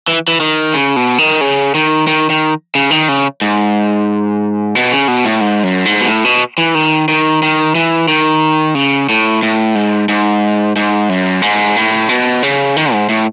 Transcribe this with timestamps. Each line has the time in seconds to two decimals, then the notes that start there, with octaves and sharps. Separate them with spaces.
0.08 E3
0.28 E3
0.40 D#3
0.74 C#3
0.96 B2
1.18 D#3
1.41 C#3
1.74 D#3
2.07 D#3
2.30 D#3
2.75 C#3
2.91 D#3
3.08 C#3
3.41 G#2
4.75 B2
4.92 C#3
5.08 B2
5.24 A2
5.41 G#2
5.63 F#2
5.85 G#2
6.01 B2
6.08 A2
6.25 B2
6.58 E3
6.75 D#3
7.08 D#3
7.42 D#3
7.75 E3
8.08 D#3
8.75 C#3
9.09 A2
9.43 A2
9.75 G#2
10.09 G#2
10.76 G#2
11.09 F#2
11.42 G#2
11.76 A2
12.09 B2
12.43 C#3
12.76 D#3
12.92 G#2
13.09 A2